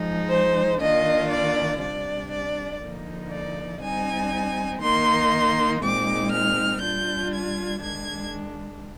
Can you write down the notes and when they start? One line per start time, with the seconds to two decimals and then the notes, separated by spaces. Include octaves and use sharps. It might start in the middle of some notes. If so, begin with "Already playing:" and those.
Already playing: F3 G#3 D#4
0.29 C5
0.79 D#3 A#3 D4 F4 D#5
1.30 D5
1.81 C3 G3 D4 D5
2.30 D5
2.80 D3 F3 A#3 D#4
3.30 D5
3.81 G3 C4 D#4 G#5
4.81 D#3 A#3 D#4 C6
5.81 A#2 G#3 C4 D#4 D6
6.32 F6
6.81 G3 D4 F4 G6
7.32 G#6
7.81 D#3 G#3 D4 G#6